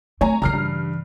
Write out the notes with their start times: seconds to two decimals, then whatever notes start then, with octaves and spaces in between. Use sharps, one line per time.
0.21 A3 C4 C#5 G#5 A#5
0.42 C#3 E3 A#5 F6 C7
0.53 G2